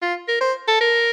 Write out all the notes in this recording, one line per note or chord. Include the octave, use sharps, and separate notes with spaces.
F4
A#4
C5
A4
A#4